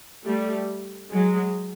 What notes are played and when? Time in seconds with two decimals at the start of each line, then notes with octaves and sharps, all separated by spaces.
0.26 G3 A3
1.12 F#3 G#3